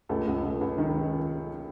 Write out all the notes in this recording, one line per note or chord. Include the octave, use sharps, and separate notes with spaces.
C#2 A3 A4
C#2
C#2
C#2
D#3